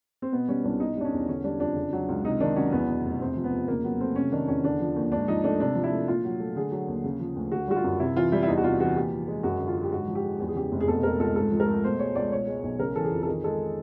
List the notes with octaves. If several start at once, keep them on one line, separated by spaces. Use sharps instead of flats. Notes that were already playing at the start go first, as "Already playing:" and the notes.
C4
B2 B3
G3 C#4
C2 D4
B2 D#4
G3 D4
C#4
E2
D3 C#4
G3 D4
F2 D4
C#3
F#3
C#2
C3 D#4
D#3 D4
F#3 C#4
E2 B3
B2
F1
C3 C4
F3
B3
F2
C#3 A#3
F#3 B3
A3 C4
C3 C#4
D#3 D4
E2 C#4
D3 D4
F3
D#2
G#2 D4
F3 D#4
A3 D4
C3 D4
F3
E4
A3
A#2 F4
F#3
A3
D3 G#4
F#3
D#2
C#3
F3
D2
D3 F#4
G3 F#4
F4
F#2
C3 E4
E3 F4
G3 E4
E4
E2 D#4
F#4
C3 F4
E3 F#4
A#2 G4
F3
G#3
F#2 F#4
D3
F4
F#3
G4
G#2 F#4
F3
G4
G#3
E2 G4
G#4
C#3 G4
F1
G#4
B2 A4
G#3 A#4
C#2 A4
G#2 A4
F3
A#4
A3
B2 C5
G#3 C#5
C#2 D5
B2 C#5
G#3
B1
C#3 A#4
E3 A4
G#4
F2
A4
D#3 G#4
G#3 A4